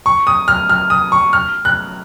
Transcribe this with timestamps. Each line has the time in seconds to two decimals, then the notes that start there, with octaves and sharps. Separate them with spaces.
0.06 C#6
0.27 D#6
0.48 F6
0.69 F6
0.90 D#6
1.12 C#6
1.33 F6
1.65 F#6